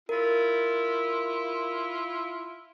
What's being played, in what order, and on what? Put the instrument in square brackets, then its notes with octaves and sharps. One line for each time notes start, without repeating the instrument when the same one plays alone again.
[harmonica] E4 F4 [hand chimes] A#4